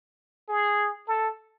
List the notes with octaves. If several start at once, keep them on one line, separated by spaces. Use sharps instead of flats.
G#4
A4